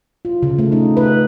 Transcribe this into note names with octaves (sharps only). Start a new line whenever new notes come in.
F4
C#3
A3
D#4
B4